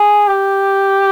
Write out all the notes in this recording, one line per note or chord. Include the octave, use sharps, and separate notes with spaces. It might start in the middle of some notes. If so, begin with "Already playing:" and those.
Already playing: G#4
G4